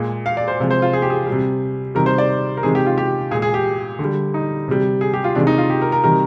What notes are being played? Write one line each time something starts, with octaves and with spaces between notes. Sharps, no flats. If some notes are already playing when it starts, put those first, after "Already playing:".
Already playing: A#2 G#3
F5
D5
C5
C3 F3 G#3
C5
F4
G#4
G4
G#4
G3
C3
C3 D#3 G3 A#4
C5
D5
A#4
C3 D#3 G#3 G#4
G4
F4
G4
A#2 G#3 G#4
G#4
G4
D3
G3
D#4
C3 G3
G#4
G4
F4
C3 D#3 G#3 D4
D#4
F4
G4
A#4
A#4
C3 D#3 G3 A#4